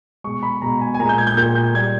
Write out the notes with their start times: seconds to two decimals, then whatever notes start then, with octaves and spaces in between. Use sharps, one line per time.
0.24 B2 G#3 C#6
0.43 B5
0.62 B2 G#3 A#5
0.81 G#5
0.94 G#5
0.99 A#2 G#3 A#5
1.09 G6
1.18 G#6
1.27 G6
1.37 A#2 G#3 G6
1.55 G6
1.75 A#2 G3 G#6